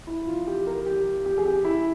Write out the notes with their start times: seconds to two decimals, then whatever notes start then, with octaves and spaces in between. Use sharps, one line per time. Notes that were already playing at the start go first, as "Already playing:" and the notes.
0.07 E4
0.27 F4
0.47 G4
0.67 A#4
0.86 G4
1.25 G4
1.38 G#4
1.45 G4
1.64 E4